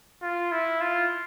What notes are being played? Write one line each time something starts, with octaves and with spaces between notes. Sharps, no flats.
F4
E4
F4